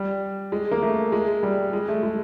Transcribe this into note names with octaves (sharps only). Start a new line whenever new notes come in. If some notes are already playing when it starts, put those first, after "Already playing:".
Already playing: G3
G#3
A#3
A3
G#3
G3
G#3
A3
G#3